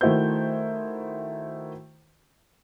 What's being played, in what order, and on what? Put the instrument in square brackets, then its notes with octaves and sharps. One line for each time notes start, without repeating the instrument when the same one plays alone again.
[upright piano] D#3 A3 E4 F#4 C5 G6